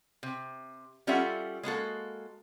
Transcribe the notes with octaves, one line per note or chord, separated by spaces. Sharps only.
C3
G3 C#4 F4 A4 E5 F#5
G#3 A#3 F#4 A4